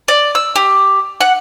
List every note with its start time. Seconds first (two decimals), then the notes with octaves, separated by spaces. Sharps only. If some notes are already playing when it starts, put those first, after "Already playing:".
0.08 D5
0.35 E6
0.56 G4
1.21 F#5